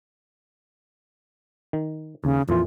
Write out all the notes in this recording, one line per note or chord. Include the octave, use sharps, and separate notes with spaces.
D#3
D#2 C#3
F2 A#2 E3 F4